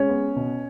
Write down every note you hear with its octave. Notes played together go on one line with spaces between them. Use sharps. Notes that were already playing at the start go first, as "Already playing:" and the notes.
Already playing: G#3 C#4 C#5
B3
B2